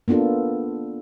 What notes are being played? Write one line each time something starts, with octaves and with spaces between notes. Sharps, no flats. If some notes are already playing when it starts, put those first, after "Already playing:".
A#3 B3 D4 F4 A4